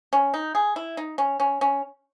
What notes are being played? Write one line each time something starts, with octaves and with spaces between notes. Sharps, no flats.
C#4
D#4
G#4
E4
D#4
C#4
C#4
C#4